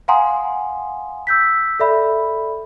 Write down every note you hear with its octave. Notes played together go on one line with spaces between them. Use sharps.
F5 F#5 G#5 A#5 C6 D#6
E6 G6 B6
A4 D5 E5 B5